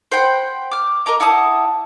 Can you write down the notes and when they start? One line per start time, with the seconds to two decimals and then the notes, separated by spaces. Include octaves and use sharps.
0.12 C5 F#5 G5 B5
0.71 D6 F6
1.06 A#4 D#5 A#5 D6
1.20 E4 F#5 A5 D#6